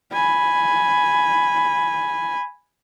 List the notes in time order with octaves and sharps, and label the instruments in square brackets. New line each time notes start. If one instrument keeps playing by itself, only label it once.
[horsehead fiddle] G#5 B5